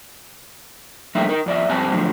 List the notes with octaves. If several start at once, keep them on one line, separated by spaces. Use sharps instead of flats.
F3 G3 A3 A#3 D#4 E5
D#4 A#4
F2 D5 E5
F2 G#2 G3 C4 G#5 A5
A2 D3 F3 F#3